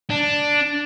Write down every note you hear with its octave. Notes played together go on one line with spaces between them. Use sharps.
D4